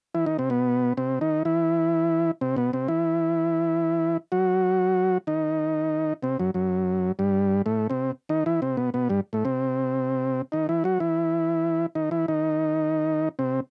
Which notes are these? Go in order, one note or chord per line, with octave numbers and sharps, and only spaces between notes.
E3 E4
D#3 D#4
C3 C4
B2 B3
C3 C4
D#3 D#4
E3 E4
C3 C4
B2 B3
C3 C4
E3 E4
F#3 F#4
D#3 D#4
C3 C4
F#2 F#3
F#2 F#3
G2 G3
A2 A3
C3 C4
D#3 D#4
E3 E4
C3 C4
B2 B3
B2 B3
G2 G3
A2 A3
C3 C4
D#3 D#4
E3 E4
F#3 F#4
E3 E4
D#3 D#4
E3 E4
D#3 D#4
C3 C4